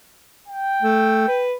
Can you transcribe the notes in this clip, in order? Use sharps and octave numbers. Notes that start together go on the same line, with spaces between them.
G5
A3
B4